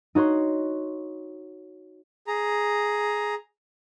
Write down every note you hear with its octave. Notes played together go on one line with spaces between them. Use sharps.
D#4 F#4 C#5 C6
G#4 A#5